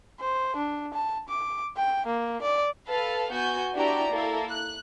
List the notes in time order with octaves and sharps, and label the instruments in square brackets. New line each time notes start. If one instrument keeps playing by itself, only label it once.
[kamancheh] C5
D4
A5
D6
G5
A#3
D5
[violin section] A4 B4 F5
B3 F#4 G#5 G6
D4 E4 F#4 G4 D5 A#5
A#3 E4 A4 A#4
F#6